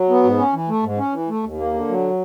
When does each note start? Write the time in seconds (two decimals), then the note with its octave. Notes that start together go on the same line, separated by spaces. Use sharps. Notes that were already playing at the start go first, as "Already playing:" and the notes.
Already playing: F#3
0.09 B3
0.23 G#2
0.38 C#4
0.53 E3
0.69 A3
0.83 G#2
0.98 C#4
1.13 E3
1.29 A3
1.43 D#2
1.58 A#3
1.74 D3
1.89 F#3